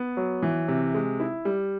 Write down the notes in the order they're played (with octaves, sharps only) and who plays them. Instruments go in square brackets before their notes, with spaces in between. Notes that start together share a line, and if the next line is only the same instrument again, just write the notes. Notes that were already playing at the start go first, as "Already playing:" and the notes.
Already playing: [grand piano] B3
F#3
E3
C3
G#3
E4
G3